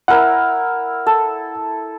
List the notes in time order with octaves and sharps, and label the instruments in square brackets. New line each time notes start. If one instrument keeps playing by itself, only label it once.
[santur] E4 A#4 E5 [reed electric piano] F#5
[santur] A4